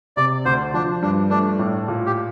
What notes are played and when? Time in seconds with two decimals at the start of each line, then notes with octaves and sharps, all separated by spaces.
0.17 C3 D5
0.45 D2 C5
0.74 F3 D4
1.02 G2 D4
1.30 A3 D4
1.59 A2
1.88 A#2
2.06 G4